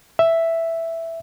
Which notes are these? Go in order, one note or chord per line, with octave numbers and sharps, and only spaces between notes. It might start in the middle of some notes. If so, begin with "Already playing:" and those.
E5